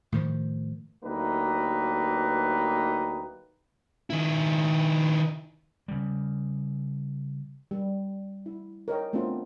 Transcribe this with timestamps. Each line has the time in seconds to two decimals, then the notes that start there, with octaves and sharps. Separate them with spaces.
0.12 A2 D#3 F3
1.04 D2 F#3 A#3 D#4 G4 B4
4.10 D#3 E4
5.88 C#3 G3
7.71 G3
8.46 E4
8.88 A#4 C#5 D#5 G5
9.13 A3 B3 C4 D4 F4 A#4